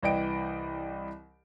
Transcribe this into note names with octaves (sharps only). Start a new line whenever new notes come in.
C2 E3 D5 D#5 G5 D7